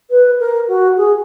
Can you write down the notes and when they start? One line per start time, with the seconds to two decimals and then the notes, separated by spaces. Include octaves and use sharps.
0.10 B4
0.40 A#4
0.68 F#4
0.97 G#4